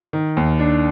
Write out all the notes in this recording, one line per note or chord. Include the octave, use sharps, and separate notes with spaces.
D#3
D#2
D4